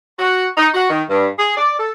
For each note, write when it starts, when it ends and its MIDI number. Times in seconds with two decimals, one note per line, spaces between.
0.19 0.46 66
0.58 0.68 63
0.74 0.89 66
0.90 1.02 51
1.10 1.27 43
1.38 1.56 68
1.56 1.76 74
1.78 1.92 69